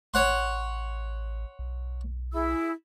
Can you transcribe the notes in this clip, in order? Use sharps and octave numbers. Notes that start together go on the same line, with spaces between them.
A1 C#5 F#5 C6
B1
E4 G#4 E6